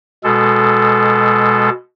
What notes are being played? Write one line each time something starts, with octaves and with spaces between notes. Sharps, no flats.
B2 G#3 A4